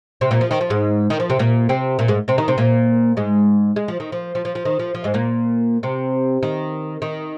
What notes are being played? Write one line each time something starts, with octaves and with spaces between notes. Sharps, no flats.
C3 C4
A#2 A#3
F3
D#3
F3
G#2 G#3
D#3
F3
C3 C4
A#2 A#3
C3 C4
A#2 A#3
G#2 G#3
C3 C4
D#3 D#4
C3 C4
A#2 A#3
G#2 G#3
G#3
F3
D#3
F3
F3
F3
F3
D#3
F3
F3
G#2 G#3
A#2 A#3
C3 C4
D#3
D#3